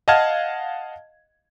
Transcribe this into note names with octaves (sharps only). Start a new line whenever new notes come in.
D#5 F5 F#5 A5 F6 G#6